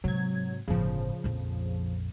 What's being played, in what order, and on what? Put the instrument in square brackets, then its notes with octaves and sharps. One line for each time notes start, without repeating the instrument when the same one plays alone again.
[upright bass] G#2 C3 [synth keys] F#3 G#6
[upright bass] G1 A2 [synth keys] C#3 F3
[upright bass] A#1 F2